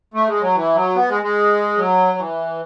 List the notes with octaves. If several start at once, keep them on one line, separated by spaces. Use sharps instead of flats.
A3
G#3
F#3
E3
F#3
B3
G#3
G#3
F#3
E3